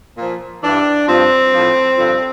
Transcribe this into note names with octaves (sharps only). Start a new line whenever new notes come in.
A#2 F3
G2 E3 D4
G2 F3 C4
A2 F3
G2 D3 F3